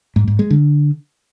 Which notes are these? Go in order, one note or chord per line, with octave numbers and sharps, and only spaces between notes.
G#2
G#2
G#3
D3